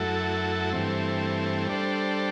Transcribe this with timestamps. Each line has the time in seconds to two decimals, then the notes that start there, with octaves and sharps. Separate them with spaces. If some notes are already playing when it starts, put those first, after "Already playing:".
Already playing: F#2 F#3 A3 E4 A4
0.72 G2 E3 A3 C4
1.67 G3 D4 A4 C5